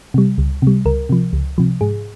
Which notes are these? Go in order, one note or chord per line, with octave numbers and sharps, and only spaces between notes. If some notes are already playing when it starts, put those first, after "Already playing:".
C3 G3
C#2
C3 G3
C#2 A#4
C3 F3
C#2
C3 F3
G#2 G#4